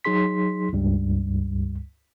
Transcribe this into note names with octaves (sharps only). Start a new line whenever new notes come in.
F#3 D#4 G#4 C6 B6
C#2 G2 G3